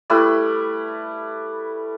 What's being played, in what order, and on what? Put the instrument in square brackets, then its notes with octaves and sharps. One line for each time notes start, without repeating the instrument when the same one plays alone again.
[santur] G3 A3 E4 B4